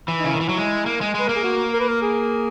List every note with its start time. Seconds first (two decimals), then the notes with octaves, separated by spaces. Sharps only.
0.08 E3
0.19 D#4
0.24 C#3
0.28 E4
0.34 D#3
0.41 E3
0.49 F#3
0.58 G#3
0.86 A#3
1.01 G#3
1.15 G#3 B4
1.28 A#3 A#4
1.36 G#4
1.44 F#4
1.74 A#4
1.80 B4
1.88 A#4
2.02 G#4